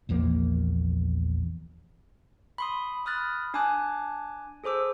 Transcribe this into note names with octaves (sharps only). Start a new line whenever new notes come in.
A#1 E2 F3 A#3
B5 C6 D#6
B5 D#6 F6 F#6 A6
D4 G#5 A5 D6 F#6
G#4 A4 C5 D6 E6